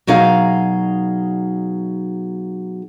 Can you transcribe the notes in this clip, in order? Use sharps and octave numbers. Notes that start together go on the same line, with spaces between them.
B2 F#3 D#4 G#4 F5